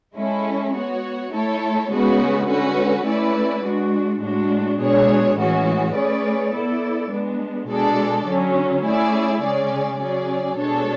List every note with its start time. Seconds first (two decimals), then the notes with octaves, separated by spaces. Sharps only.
0.16 G#3 C#4 E4 A4
0.73 B3 F#4 C#5
1.32 A3 E4 A4 C#5
1.89 C#3 G#3 B3 F#4 B4
2.47 D3 G#3 C#4 F#4 B4
3.05 A3 C#4 E4 B4 D5
3.63 G#3 D4 F#4
4.21 A2 G#3 D4 F#4
4.79 B2 G#3 D4 G#4 C#5
5.37 A2 E3 G#3 C#4 F#4
5.94 A3 C#4 G#4 B4 D5
6.53 B3 E4 A4 D5
7.10 G#3 B3 D4
7.68 B2 G#3 D4 A4 D5
8.26 D3 F#3 C#4
8.84 A3 C#4 E4 G#4 D5
9.42 C#3 G#3 C#4 G#4 D5
10.00 C#3 F#3 C#4 G#4 D5
10.58 B2 G#3 D4 A4 C#5